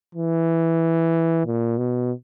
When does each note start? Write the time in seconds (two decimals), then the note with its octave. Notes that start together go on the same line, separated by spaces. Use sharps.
0.15 E3
1.46 A#2
1.78 B2